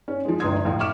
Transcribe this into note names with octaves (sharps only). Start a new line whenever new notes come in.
C#4
F3 G#3
G1 C#2 D4 C6 D#6 G#6
F2 A2 F5
E5 C#6 D6 F6 E7